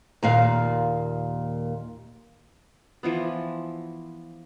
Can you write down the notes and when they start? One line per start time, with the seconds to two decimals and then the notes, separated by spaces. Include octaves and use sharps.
0.23 D#2 A#2 F5
3.03 E3 F3 B3